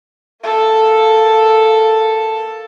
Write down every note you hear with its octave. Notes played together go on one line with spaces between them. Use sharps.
A#3 A4